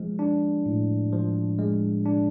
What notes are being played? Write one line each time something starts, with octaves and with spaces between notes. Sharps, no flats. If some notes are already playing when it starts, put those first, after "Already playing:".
Already playing: F3 G#3
D4
A2
F3
G#3
D4